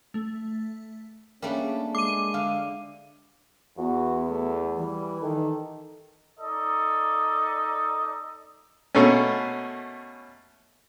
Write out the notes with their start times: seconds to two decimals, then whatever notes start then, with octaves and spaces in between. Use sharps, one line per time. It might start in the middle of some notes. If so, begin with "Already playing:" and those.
0.14 A3
1.42 G3 A3 A#3 C#4 D4 G#4
1.95 G#3 D6 D#7
2.34 D3 F5
3.78 E2 B3 F#4
4.30 A3
4.77 E3 G3
5.22 D#3 A4
6.40 D#4 A4 D5 D#5
8.95 B2 A3 A#3 C#4